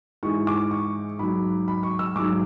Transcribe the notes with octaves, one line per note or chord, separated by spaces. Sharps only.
G#2 E3 G#3 C#6
D6
C#6
G#2 F#3 B5
B5
C#6
E6
G#2 F#3 D6